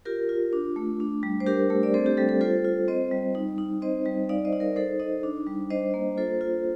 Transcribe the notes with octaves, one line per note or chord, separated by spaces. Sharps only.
F4 G4 A#4
F4
D4
A3
D4
G3
C5
D4 G4 A#4
A3
D5
C4 A4 C5
G4
G3 A4
A4
F4 A4 C5
F4
C4 C5 D#5
G3
D#4
D#4
C4 C5 D#5
G3
D#4 D5 F5
C5 D#5
D#4
A#4 D5
D#4 A4 C5
D#4 C5 D#5
D4
G3
D4 C5 D#5
A#3
F4 A4 C5
F4